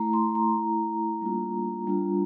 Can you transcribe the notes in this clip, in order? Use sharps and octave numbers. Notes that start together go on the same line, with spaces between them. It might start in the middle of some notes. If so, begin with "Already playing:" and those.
Already playing: A3 E4 A#5
C6
A#5
A3 E4
G3 A#3 D4 F4
G3 D4 F4